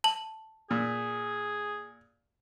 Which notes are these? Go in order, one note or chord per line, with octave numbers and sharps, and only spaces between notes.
A5 F#7
A#2 G#4